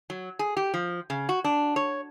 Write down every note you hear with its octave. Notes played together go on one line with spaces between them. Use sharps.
F#3
G#4
G4
F3
C#3
F#4
D4
C#5